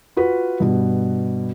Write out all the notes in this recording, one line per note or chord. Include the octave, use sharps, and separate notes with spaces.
F4 F#4 B4
G2 B2